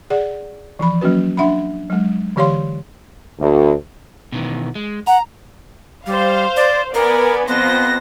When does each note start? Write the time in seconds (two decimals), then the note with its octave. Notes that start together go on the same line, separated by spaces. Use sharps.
0.10 G#4 D5 F#5
0.79 E3 F3 B5
1.01 F#3 A#3 C#4 F#4 B4
1.37 D4 E5 F#5 B5
1.90 F#3 G#3
2.36 D3 E3 G4 C#5 F5 C6
3.40 D2
4.32 B2 D#3 E3
4.75 G#3
5.07 F#5 A#5
6.06 G3 C5 F5
6.57 D5
6.94 B3 A#4 D5 G#5
7.48 F2 B3 C5 A#6